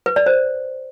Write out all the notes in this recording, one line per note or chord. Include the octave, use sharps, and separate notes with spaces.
B4
D5
C5